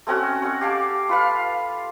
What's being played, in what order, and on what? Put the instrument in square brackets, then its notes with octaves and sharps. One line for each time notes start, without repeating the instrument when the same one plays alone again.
[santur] A3 C4 C#4 F#4
C#5 F#5
G4 F5 A5 D6
F4 B4 F5